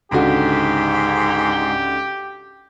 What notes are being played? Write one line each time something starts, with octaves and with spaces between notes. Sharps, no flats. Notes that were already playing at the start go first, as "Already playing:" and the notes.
C#2 G#2 D3 F#4 G4